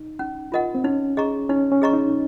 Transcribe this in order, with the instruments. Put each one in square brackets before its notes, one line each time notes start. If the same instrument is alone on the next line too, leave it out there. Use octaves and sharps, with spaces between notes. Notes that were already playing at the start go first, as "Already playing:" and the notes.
Already playing: [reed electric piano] D#4
[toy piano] C#4
F4 A#4 D#5 F#5
[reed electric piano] C4
[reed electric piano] C#4 [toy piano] D#4
[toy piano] G#4 D#5 A#5 C#6
[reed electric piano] C#4 [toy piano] D#4
[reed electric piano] C#4
[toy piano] G#4 D#5 A#5 C#6
[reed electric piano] D#4